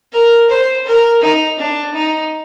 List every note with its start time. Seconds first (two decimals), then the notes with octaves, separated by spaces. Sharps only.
0.13 A#4
0.50 C5
0.86 A#4
1.22 D#4
1.58 D4
1.94 D#4